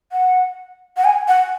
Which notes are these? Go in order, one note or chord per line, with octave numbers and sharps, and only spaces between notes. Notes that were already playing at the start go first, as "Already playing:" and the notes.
F#5
F#5
G#5
F#5